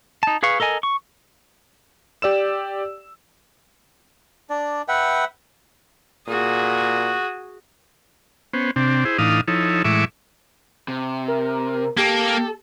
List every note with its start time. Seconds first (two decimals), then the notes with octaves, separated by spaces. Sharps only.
0.23 D#4 A5
0.43 G#4 B4 F5 C#6
0.60 A4 A#4 D#5 G#5
0.83 C#6
2.22 G4 D5 E6 E7
4.50 D4 D5
4.88 B4 E5 F#5 G5
6.27 A#2 F#4 G#4
8.53 B3 C#4 C5
8.76 C3 C4 D4
9.05 E4 G#4 C5
9.18 A2 E3 D4 D#4 F5 D#6
9.48 F3 D#4 E4 A4 C#5
9.85 A2 E3 G#3 E5 C#6 D6
10.88 C3
11.28 A#4
11.98 A#3 G4 A4